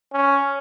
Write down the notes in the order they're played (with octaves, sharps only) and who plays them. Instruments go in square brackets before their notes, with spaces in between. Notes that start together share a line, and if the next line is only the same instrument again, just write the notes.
[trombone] C#4